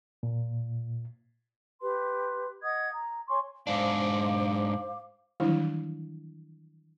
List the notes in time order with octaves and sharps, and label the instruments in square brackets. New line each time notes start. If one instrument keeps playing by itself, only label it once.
[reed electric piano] A#2
[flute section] G4 B4 C6
D#5 F#5 D#6 G#6
A#5
C#5 G#5 C6 C#6
[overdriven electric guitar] G#2 D4 [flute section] C5 F5 D6
[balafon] D#3 E3 F#3 G3 D4 E4